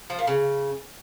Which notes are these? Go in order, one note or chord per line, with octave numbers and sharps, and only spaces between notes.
F3
A#2
C#3